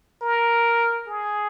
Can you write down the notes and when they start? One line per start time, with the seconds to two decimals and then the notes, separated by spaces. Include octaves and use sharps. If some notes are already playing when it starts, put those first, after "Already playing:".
0.22 A#4
1.07 G#4